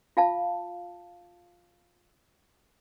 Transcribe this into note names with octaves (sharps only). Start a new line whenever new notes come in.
F4 F5 A5